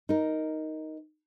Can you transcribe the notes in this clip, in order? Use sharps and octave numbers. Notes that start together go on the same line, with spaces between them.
D#4 A#4